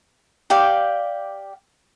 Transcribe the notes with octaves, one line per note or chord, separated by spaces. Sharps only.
G4 D5 F5 G5